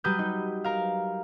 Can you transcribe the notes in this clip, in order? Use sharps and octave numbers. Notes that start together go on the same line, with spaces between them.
F#3 G3 B4 D#6 G6
D#4
A#4 F5